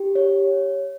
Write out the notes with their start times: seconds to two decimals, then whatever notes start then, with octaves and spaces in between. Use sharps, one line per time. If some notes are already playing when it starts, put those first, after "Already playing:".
Already playing: G4
0.15 C#5